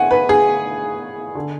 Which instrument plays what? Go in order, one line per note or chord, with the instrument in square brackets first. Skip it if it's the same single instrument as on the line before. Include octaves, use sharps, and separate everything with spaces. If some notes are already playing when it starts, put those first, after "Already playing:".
Already playing: [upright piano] A1 A2 F#5 G#5
B4
G#4
D3